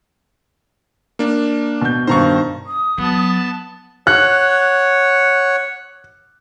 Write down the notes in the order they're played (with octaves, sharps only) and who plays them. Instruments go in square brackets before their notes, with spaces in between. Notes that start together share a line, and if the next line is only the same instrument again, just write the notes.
[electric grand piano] A#3 D4
[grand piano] B2 G6
[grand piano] G2 B2 D#3 [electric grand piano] C5 A#5 C#6
[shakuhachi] D#6
[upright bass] F#3 [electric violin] B3 A5
[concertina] C#5 F#5 [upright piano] F#6